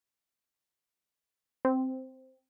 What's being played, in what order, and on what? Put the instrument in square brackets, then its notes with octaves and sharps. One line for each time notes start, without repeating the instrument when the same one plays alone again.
[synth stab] C4